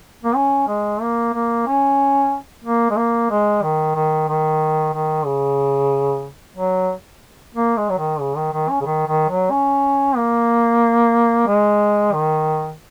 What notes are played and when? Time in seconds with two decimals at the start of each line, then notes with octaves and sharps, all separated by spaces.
0.24 A#3
0.36 C#4
0.68 G#3
1.01 A#3
1.34 A#3
1.67 C#4
2.64 A#3
2.90 G#3
2.97 A#3
3.31 G#3
3.63 D#3
3.95 D#3
4.28 D#3
4.94 D#3
5.26 C#3
6.57 F#3
7.55 A#3
7.77 G#3
7.90 F#3
7.99 D#3
8.20 C#3
8.37 D#3
8.53 D#3
8.70 C#4
8.81 C#3
8.86 D#3
9.07 D#3
9.30 F#3
9.51 C#4
10.16 A#3
11.47 G#3
12.13 D#3